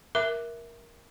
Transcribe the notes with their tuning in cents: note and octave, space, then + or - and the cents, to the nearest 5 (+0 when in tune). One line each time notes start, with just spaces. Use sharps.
A#4 +10 E5 +0 D6 +0